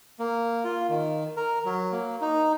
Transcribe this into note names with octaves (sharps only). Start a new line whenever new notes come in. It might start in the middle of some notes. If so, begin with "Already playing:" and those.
A#3
F4
D#3
A#4
F#3
A#3
D#4